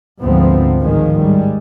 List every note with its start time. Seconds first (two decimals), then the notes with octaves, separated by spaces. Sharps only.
0.23 D2 G#2 F3 B3 C4
0.82 A1 G#2 D#3 F3 G#3
1.21 G3 G#3